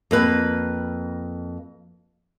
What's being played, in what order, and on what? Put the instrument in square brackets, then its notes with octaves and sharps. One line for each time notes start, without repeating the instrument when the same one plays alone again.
[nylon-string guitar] F2 A#3 B4